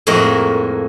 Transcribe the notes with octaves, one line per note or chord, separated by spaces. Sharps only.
F2 A2 G#3 A#3 F#4